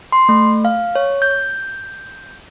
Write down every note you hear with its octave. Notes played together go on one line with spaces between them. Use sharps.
C6
A3
F5
C#5
G6